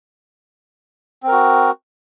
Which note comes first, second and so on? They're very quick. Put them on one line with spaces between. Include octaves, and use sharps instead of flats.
C4 A#4 F#4